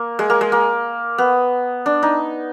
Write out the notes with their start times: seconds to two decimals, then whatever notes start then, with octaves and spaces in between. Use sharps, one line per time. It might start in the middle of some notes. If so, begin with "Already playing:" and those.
Already playing: A#3
0.19 G#3
0.30 A#3
0.41 G#3
0.52 A#3
1.18 B3
1.86 D4
2.03 D#4